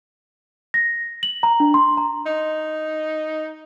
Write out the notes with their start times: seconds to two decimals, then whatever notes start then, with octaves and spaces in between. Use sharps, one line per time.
0.74 A#6
1.23 F#7
1.43 A#5
1.60 D4
1.74 C6
1.97 A#5
2.26 D#4